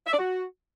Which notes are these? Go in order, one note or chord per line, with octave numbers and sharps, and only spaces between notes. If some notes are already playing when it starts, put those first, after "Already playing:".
E5
D5
F#4